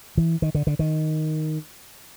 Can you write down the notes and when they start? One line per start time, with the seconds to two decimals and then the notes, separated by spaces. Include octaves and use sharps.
0.17 E3
0.42 D#3
0.55 D3
0.67 D3
0.79 D#3